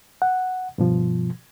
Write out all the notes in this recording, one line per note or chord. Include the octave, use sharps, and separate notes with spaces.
F#5
G2 B2 F3